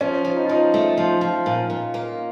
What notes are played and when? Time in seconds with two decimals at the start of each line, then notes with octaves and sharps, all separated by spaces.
0.01 F3 C#4
0.25 F3
0.37 D#4
0.45 F4
0.49 F3 D#4
0.74 A3
0.97 F3
1.21 F3
1.46 A#2
1.70 A#2
1.94 A#3